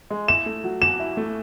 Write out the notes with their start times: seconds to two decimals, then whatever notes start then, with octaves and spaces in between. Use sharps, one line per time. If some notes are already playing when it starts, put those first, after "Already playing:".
0.10 G#3
0.28 E4 E7
0.46 A3
0.64 F#3
0.81 F#3 E7
1.00 E4
1.17 A3